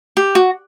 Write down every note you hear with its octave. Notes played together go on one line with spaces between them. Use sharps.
G4
F#4